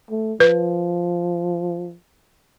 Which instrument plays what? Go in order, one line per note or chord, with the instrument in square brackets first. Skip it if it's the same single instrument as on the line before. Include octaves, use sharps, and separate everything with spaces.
[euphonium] A3
[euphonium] F3 [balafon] B4